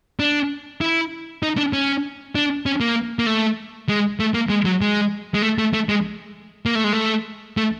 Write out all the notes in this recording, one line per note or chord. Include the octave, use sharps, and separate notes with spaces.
D4
E4
D#4
D4
C#4
D4
C#4
A#3
A#3
A3
G#3
A3
A#3
G#3
F#3
G#3
G#3
A3
A3
A3
G#3
A#3
A3
G#3
A3
A3